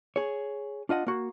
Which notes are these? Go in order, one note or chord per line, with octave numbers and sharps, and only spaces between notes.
G#4 C#5
D4 F4 D#5 F#5
A#3 F#4